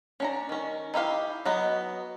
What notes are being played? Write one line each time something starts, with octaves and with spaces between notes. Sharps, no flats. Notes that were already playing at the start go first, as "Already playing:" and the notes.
C#4 D4 A#5
D#3 C#4
D#4 E4 G4 F5
F#3 B3 D#5